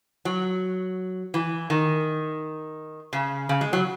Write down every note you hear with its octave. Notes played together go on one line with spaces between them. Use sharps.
F#3
E3
D#3
C#3
C#3
G#3
F#3